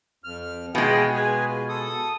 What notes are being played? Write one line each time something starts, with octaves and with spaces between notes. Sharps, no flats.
F2 F6
B2 G#3 F4 G#4 G5
G#4 B4 G#5
F4
A4 D#6